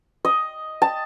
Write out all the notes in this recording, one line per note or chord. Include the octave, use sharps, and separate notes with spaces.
D#5
A5